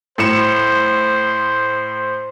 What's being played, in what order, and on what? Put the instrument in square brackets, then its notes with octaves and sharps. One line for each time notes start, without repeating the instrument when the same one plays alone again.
[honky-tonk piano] A2 C#7 E7 [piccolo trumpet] C5